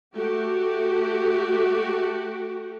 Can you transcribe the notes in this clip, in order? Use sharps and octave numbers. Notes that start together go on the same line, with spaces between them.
A3 F#4 G4